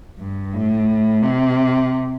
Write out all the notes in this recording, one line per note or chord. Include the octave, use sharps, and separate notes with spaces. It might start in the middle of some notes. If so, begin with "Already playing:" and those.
G2
A2
C3